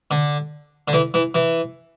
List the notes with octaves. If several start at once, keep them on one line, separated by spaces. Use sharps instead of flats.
D3
D3
E3
E3
E3